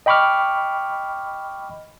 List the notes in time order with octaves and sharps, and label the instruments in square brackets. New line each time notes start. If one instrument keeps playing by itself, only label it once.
[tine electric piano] D#5 G5 B5 C#6 D6 F6